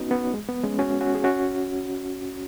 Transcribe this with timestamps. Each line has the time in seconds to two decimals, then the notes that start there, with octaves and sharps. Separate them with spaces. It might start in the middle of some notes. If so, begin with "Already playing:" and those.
Already playing: B3 C#4 D#4 F#4
0.11 B3
0.34 G#3
0.49 B3
0.64 G#3 C#4
0.79 C#4 F#4
1.01 C#4 F#4
1.15 G#4
1.24 C#4 F#4